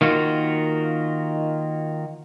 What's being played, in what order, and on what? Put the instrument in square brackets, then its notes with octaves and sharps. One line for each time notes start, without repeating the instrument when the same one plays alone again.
[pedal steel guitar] D#3 A#3 F4 F#4